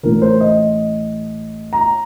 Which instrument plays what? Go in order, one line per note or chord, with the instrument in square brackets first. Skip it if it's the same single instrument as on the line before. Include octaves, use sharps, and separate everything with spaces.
[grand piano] A1 A2 A3 A#4
C5
D#5
A#5